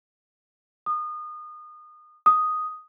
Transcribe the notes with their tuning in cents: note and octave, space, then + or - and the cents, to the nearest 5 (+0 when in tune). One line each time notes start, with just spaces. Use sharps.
D#6 -30
D#6 +0